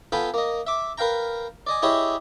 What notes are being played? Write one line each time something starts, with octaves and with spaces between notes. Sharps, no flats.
B3 F4 A4 G5 G#5 B5
A#3 D#5
E5 D6
A#4 B4 F5 G5 A#5
D5 D#5 G#5
E4 G4 G#4 C#5 D#5 E5